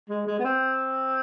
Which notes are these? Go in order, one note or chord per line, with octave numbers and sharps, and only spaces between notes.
G#3
G#3
B3
C4